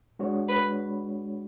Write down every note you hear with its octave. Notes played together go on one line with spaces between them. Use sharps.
G#3 D4 F#4 C#5
B4